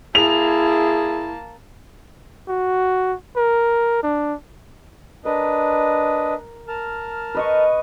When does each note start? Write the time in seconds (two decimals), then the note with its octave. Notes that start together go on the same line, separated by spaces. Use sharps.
0.15 A#3 E4 G#4 A5 F7
2.48 F#4
3.36 A#4
4.03 D4
5.25 D4 A#4 B4 D#5
6.68 A#4 A5 F6
7.35 B4 D#5 C#6